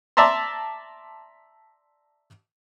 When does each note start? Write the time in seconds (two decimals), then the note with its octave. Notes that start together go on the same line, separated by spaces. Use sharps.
0.17 D5 E5 A5 A#5 C6